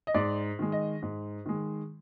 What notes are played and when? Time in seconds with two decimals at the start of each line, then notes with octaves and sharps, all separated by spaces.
0.07 D#5
0.14 G#2 D5
0.59 D#3 G#3
0.72 D#5
1.02 G#2
1.46 D#3 G#3